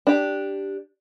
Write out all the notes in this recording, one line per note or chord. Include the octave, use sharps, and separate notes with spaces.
D4 G4